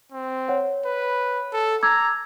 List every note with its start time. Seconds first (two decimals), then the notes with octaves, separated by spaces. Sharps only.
0.12 C4
0.48 C#5 F#5
0.86 B4
1.53 A4
1.83 A#5 D6 E6 G#6